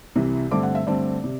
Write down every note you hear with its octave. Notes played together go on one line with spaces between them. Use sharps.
C2 C3 E3
G2 D3 A3 C4 D6
F#5
E5
G2 D3 A3 C4 D5
C3